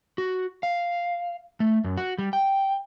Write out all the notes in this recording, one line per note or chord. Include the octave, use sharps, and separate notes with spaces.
F#4
F5
A3
F#2
F#4
G3
G5